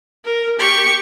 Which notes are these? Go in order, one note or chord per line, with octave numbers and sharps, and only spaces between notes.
A#4
G4 C#6